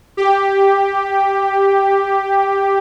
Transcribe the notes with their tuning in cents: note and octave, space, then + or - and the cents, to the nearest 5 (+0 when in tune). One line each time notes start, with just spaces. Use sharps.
G4 +5